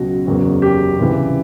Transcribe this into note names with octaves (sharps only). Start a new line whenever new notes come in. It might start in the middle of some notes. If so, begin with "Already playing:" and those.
Already playing: C#2 B2 F#3 F#4
F#1 E2 C#3 F#3
G4
C#2 C3 E3 G3